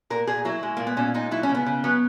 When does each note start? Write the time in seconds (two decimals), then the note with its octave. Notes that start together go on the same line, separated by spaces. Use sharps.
0.10 A#2 A#4
0.27 A#2 G#4
0.45 F#3 E4
0.63 G#3
0.77 A#2 A#3
0.87 B3
0.97 A#2 C#4
1.14 G#3 D#4
1.31 F#3 E4
1.43 C#4
1.49 C#3
1.55 B3
1.66 C#3
1.84 F#3 B3